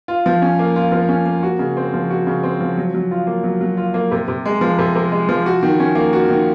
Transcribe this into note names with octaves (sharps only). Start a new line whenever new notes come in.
F4
F3
C#4
A#3
F4
F3
C#4
A#3
F#4
C#3
C4
F3
F#4
C#3
C4
F3
F#3
F#3
F4
A#3
F#3
F#3
F4
A#3
C3
C3
G#3
F3
C3
C3
G#3
F3
F#4
D#3
C#4
A#3
F#4
D#3